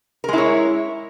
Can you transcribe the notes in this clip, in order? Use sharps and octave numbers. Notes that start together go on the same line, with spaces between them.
G#3 E4 A#4 C#5